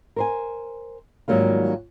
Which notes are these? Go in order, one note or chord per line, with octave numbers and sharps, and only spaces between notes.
A#4 C5 G#5
G#2 D#3 F#3 G3 A#3 F4